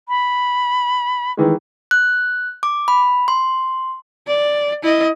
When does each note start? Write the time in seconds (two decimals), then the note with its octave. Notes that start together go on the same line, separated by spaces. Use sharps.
0.09 B5
1.37 D#3 E3 G#3
1.91 F#6
2.63 D6
2.88 B5
3.28 C6
4.27 D5
4.83 E4 D#5